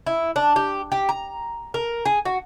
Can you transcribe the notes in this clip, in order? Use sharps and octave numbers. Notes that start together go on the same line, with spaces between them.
E4
D4
G4
G4
A#5
A#4
G#4
F#4